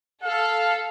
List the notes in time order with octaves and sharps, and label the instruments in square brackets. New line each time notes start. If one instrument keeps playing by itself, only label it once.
[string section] A4 [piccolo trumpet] F5